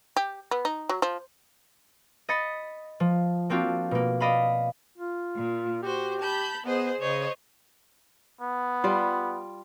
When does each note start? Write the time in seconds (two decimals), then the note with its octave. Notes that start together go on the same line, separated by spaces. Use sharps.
0.17 G4
0.51 B3
0.65 D#4
0.89 F#3
1.02 F3
2.29 D#5 B5 A6 C#7
3.00 F3
3.50 A#3 C4 D4 F4 F#4
3.91 B2 A#3
4.20 D5 D#5 F5 B5
4.98 F4
5.36 A#2
5.83 F#4 G4 C5
6.20 A5 B5 G6
6.65 B3 G#4 C5 D#5
6.99 C#3 C5 C#5 D#5
8.41 B3
8.84 G3 F4